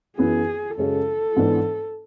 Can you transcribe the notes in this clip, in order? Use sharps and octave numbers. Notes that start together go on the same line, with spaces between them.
F#2 E3 B3 E4 G#4
F#2 C#3 G#3 C#4 G#4 A4
G#2 E3 B3 D4